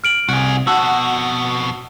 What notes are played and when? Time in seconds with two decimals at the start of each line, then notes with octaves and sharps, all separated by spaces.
0.04 F6 D7 F#7
0.29 C2 F#4 G#4
0.67 F2 B2 F#4 F#5 A5 E6